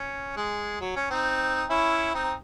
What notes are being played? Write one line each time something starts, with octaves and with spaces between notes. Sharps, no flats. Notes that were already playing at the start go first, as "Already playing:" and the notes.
Already playing: C#4
G#3
F#3
C#4
C4 D#4
C#4 E4
C4 D#4